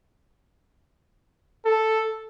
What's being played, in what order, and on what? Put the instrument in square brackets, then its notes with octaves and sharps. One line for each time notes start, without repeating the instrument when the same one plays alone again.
[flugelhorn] A4